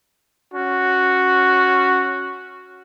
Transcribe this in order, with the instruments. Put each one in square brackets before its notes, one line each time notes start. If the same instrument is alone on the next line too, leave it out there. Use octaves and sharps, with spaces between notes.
[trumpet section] C#4 F#4